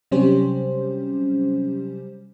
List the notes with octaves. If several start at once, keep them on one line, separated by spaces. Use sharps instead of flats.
C3 F#3 G3 C#4 G4 C5